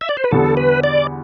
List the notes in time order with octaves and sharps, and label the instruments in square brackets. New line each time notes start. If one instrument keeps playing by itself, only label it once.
[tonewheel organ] E5
D5
C5
B4
[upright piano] E2 D3 G3 B3 [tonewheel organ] A4
[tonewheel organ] B4
D5